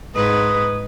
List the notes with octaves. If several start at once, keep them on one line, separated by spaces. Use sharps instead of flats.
G#2 G#3 B4 D#6